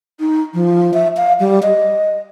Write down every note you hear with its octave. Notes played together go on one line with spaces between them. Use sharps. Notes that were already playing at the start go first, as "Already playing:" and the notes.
D#4
F3
E5
F5
G3
D#5